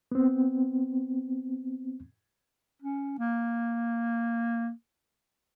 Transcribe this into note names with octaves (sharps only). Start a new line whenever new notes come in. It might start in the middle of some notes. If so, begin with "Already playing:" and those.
B3 C4
C#4
A#3